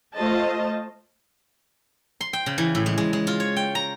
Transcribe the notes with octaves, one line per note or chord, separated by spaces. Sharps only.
A3 F4 C5 D#5 A5
C6
G5
C#3
E3
A2
G#3
G#3
G#3
F4
C#5
G5
A#5